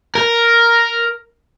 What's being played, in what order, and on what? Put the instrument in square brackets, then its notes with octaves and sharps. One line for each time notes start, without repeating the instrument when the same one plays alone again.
[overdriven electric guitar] A#4